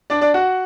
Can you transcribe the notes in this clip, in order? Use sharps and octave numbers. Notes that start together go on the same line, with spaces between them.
D4 D5
D4 D5
F#4 F#5